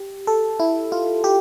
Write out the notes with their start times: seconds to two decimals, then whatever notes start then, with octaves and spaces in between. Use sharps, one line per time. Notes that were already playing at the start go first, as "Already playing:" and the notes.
Already playing: G4
0.27 A4
0.60 E4
0.92 F4
1.24 G4